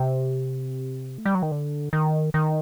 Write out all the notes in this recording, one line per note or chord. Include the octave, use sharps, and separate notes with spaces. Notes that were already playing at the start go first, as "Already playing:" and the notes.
Already playing: C3
A3
G3
F#3
D#3
D3
D#3
D#3